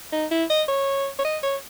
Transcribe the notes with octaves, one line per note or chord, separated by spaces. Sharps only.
D#4
E4
D#5
C#5
C#5
D#5
C#5